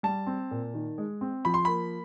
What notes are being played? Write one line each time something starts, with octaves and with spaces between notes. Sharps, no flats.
G3 A5
C4
A#2
D#3
G#3
C4
F3 B5
C6
A#3 B5